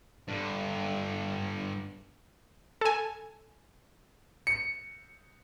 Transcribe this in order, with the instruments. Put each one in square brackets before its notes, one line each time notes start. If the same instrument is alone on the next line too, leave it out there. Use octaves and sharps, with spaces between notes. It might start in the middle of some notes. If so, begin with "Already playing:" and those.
[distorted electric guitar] G2 D3
[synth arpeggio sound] A4 G#5
[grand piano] C#7